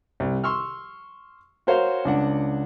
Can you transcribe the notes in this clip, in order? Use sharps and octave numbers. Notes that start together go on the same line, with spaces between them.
C2
C6 C#6 E6 F6
F#4 A#4 C5 C#5 F5
C#2 D4 F#5